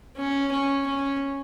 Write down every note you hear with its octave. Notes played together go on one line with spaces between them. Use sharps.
C#4
C#4
C#4